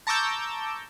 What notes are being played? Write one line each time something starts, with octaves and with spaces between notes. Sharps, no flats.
A5 A#5 C#6 D6 E6 G6